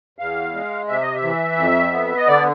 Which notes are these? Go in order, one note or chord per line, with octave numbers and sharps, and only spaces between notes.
E2 F5
G#3
C3 E5
D#5
E5
E3
F2
B3
D#5
D3 D5